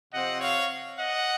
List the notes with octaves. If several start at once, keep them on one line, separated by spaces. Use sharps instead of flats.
C3 F3 C4 D#5 F#5
C#5 F5
D#5 F#5